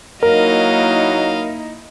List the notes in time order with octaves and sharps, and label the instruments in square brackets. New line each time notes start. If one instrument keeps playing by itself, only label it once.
[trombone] F#3 [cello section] A#3 D#4 E4 [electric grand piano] A#4 [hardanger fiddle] D#5 F5